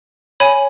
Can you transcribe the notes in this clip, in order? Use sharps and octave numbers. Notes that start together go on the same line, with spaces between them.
C#5 G#5 B5